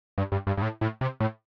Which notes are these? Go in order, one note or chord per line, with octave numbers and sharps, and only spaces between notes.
G2
G2
G2
G2
A2
A2
C3
A2